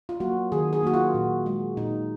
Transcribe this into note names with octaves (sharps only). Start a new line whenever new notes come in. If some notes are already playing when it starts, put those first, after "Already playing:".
F4
F#3 A#3 F#4
D#3 G#4
G#4
F#3 A#3 F#4
F4
A#2
G#3
A#2 D#4